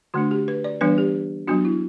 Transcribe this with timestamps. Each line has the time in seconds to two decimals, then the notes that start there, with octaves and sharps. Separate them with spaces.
0.14 D3 A3 D4 F#4
0.31 G4
0.48 B4
0.64 D5
0.81 E3 G3 B3 D4 B4
0.98 G4
1.47 F#3 B3 D4 F#4
1.65 E4